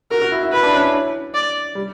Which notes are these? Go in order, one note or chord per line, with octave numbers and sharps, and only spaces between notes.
F#4 A#4
F#4
E4
E4
E4 B4
D4
C#4
C#4
D5
G3